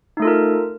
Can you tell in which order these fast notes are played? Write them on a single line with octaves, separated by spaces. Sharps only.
D#4 A3 A4 F4 A#4